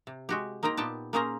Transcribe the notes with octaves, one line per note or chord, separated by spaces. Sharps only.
C3
G#3 F#4 G4
A#3 D#4 C5 G5 A#5
A#2 B3 G4 G5 A5
A#3 C#4 G#4 C5 A#5